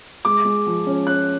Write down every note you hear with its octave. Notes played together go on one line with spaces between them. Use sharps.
G#3 D6
G#3
F3
C#4
C#4 F#6